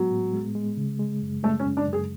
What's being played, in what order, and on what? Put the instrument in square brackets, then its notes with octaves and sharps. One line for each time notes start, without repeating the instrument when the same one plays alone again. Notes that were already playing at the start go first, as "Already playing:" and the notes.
Already playing: [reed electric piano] A2 G#3 B3 [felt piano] F#3
[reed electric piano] A2
G#3
G#3
C#3
G#3
F#2
[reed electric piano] G#3 [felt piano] A3
[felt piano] C#4
[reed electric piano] F#2
[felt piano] D4
[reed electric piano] F#2 [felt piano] G#4